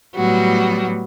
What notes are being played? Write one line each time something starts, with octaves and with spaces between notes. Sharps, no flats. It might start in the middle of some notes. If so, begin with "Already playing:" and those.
A2 F#3 G3 B3 F#4